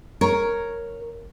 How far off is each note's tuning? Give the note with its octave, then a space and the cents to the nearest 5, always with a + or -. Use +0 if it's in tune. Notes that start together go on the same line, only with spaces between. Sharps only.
A#4 +0 C#5 +0